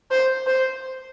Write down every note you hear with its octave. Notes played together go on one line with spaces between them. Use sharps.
C5
C5